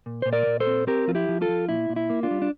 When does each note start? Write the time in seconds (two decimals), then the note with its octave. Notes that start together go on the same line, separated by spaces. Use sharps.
0.06 A#2
0.22 A#2 C5
0.33 A#4 D5
0.46 A#2
0.60 A4 C5
0.67 C4
0.87 C4 G4 A#4
1.08 F3 F4
1.15 E4 G4
1.28 F3
1.42 F4 A4
1.49 F3
1.69 A#2 E4
1.90 A#2
1.96 E4
2.10 A#3
2.23 D4 F4
2.31 G3
2.42 D4